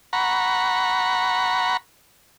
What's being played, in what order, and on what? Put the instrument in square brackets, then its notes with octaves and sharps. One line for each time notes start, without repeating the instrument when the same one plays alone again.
[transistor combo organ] F#5 A#5 B5 C#6